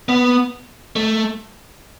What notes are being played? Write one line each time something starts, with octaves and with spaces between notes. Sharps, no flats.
B3
A3